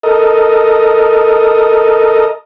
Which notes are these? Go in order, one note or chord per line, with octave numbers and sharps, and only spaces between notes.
A4 A#4 D#5